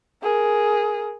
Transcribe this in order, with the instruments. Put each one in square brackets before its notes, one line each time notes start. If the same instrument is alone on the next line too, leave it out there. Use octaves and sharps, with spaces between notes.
[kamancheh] G#4 A#4